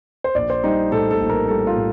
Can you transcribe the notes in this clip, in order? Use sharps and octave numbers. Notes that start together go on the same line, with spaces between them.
C5
A#1 D5
C5
G3 D#4
A2 A4
A4
A#1
A#4
G3 A4
F4
A2